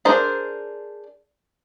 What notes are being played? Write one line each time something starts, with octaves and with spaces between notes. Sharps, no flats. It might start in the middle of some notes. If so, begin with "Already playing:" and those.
D4 G#4 A#4 C5